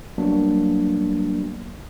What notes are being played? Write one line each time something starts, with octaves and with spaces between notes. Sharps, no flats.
F#3 G3 A#3 B3 D4 F#4